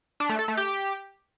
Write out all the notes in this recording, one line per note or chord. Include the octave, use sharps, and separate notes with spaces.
D4
A3
A4
A3
G4